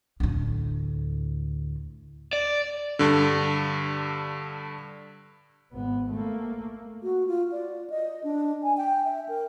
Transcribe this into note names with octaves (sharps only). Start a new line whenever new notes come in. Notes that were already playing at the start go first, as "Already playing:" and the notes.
D2 A2
D5
G2 D3
G#1 B3
A3 A#3
F#4
F4
D5
D#5
D4
G#5
G5
E5
A#4